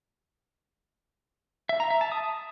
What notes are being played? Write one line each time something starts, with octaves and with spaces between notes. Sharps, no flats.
E5
A#5
E5
A5
D#6